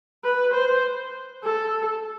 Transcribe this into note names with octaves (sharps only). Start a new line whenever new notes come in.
B4
C5
A4